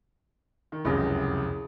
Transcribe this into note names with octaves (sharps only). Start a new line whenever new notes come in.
D#3
F1 C#2 F#2 C3 E4 G#4